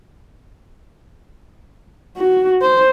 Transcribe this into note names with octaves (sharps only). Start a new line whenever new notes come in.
F#4
C5